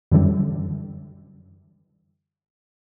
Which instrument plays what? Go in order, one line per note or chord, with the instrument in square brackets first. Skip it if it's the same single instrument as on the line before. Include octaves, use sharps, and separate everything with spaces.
[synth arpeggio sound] F#2 D3 E3 G3